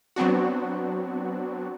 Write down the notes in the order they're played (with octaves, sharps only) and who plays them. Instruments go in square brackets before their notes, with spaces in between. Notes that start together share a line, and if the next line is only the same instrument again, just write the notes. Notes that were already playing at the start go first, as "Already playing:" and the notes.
[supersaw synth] F#3 B3 C4 D4 F#4